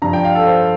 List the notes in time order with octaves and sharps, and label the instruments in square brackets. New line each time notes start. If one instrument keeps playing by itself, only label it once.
[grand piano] G2 F3 A#5
G5
F5
A4
C5